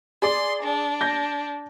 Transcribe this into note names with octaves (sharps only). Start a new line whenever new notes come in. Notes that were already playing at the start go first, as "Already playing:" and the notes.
G#4 D5 C6
D4
G6 A#6